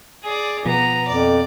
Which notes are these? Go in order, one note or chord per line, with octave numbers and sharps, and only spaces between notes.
G#4 D5
B2 F3 B3 A#5
F2 D5